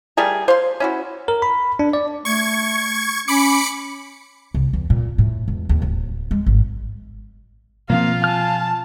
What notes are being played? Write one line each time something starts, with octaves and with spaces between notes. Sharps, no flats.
G3 A3 G#4 A#4
C5 F5 C6
C#4 E4 F#4
A#4
B5
D4
D5
A3 C#6 G#6
C#4 B5 D6 C#7
C2
E2
A#2
A2
E1
D#2
D1
G#3
G#1
B2 F3 A#3 C4 F4 F5
G#5 A5 F6